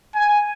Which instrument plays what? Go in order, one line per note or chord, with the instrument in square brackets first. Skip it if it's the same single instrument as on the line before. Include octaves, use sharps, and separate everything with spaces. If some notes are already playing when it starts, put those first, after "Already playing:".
[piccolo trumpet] G#5